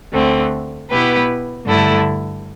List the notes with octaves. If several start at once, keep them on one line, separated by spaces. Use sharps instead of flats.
D2 D3 A3 C4
B2 B3 E4 G4 B4
G2 D3 A3 E4 A4